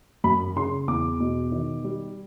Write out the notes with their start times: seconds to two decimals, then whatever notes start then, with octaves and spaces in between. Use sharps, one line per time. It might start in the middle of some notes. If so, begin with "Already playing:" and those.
0.24 F#2 B5
0.56 C#3 C6
0.88 E2 D6
1.20 B2
1.52 D#3
1.84 G3